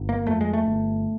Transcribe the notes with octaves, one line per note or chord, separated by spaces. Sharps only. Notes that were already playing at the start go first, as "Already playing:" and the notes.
Already playing: G1
A#3
F2 A3
G#3
A3
G1